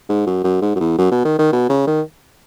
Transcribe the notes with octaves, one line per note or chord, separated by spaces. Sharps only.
G#2
F#2
F#2
G#2
F#2
E2
F#2
B2
D#3
D#3
B2
C#3
D#3